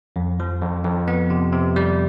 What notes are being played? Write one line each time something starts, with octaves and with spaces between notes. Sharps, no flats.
F2
F3
F2
F2
B3
C3
C3
G3